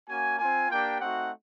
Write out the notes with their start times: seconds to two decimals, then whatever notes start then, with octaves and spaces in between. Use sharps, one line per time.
0.09 A#3 C#4 F#4 G#5
0.39 C4 F4 G#5
0.70 A#3 D4 G4 G5
1.01 A3 C4 D#4 F#4 F#5